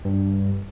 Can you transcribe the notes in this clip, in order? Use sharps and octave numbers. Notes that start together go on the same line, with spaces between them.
G2